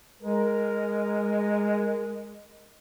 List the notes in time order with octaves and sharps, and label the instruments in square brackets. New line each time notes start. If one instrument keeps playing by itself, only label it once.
[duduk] G#3 [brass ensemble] A#4